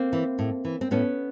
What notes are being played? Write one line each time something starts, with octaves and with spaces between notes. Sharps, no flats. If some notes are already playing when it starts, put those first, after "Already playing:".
Already playing: A#3 C4
E3
A2
E3
C4
A2 B3 C#4